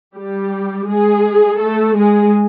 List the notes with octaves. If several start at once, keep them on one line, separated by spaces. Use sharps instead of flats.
G3 G4
G#3 G#4
A3 A4
G#3 G#4